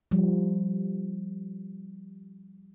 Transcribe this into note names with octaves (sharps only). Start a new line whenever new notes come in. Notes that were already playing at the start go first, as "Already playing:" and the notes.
F3 G3